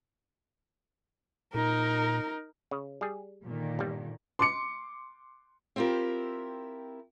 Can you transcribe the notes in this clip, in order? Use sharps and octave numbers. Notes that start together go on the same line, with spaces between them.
A#2 D#4 A#4
C#3
G3 G#4
A#2 D3 D#3
G1 G3
C6 D6 C#7
C4 E4 F4 G4 A#4